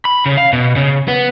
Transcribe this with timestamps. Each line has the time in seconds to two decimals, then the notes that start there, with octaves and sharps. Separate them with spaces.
0.05 B5
0.26 C#3
0.37 F5
0.53 B2
0.76 C#3
1.08 B3